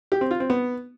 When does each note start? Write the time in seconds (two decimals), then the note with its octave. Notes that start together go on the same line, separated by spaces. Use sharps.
0.12 G4
0.21 C4
0.31 F4
0.40 C4
0.50 B3